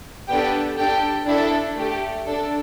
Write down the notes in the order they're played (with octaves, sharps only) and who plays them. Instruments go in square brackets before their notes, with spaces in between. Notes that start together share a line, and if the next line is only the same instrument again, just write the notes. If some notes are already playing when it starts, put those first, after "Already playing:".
[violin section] B3 D4 G4 A4 G5
D4 G4 A4 G5
D4 E4 A4 E5
A3 G4
D4 A4